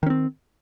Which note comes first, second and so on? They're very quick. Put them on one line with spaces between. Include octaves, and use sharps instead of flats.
D#3 C#4 C4